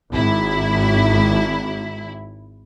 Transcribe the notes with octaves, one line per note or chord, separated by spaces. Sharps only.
G#1 E4